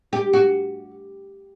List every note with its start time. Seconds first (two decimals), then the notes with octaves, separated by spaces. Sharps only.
0.13 G4
0.33 F#4